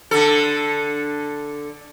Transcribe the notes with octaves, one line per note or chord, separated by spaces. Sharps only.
D3 A4